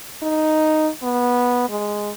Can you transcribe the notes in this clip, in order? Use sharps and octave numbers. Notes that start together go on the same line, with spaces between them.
D#4
B3
G#3